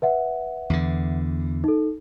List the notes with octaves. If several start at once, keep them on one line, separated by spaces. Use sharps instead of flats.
B4 E5 F#5
E2 D3
D#4 A4